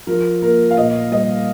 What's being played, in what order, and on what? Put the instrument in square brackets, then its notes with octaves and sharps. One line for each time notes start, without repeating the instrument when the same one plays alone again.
[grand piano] F3 [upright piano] A#4
[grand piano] A#3 [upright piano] A#4
[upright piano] F5
[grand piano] A#2 [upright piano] D#5
[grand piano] G3 [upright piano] D#5